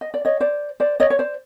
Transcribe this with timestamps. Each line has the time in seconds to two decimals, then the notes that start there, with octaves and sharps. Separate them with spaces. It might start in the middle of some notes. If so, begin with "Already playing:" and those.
0.01 D#5
0.14 D5
0.25 C#5 D#5
0.40 C5 D5
0.80 C5 D5
1.00 C#5 D#5
1.10 C#5
1.19 C5 D5